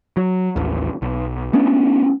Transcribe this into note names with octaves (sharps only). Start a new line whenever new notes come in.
F#3
A1 D#2
B1
A3 B3 C#4 D4